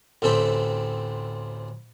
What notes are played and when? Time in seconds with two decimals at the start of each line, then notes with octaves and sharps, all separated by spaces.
0.22 A1 D2 C4 A4 G5 B5